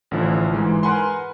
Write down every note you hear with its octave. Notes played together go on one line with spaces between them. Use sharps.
A1 D3 F3 E4
G#2 E3 G#3
A#4 B4 F#5 G#5 B5 C6